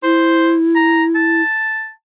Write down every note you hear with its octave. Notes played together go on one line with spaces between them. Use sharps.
E4 C5
A#5
A5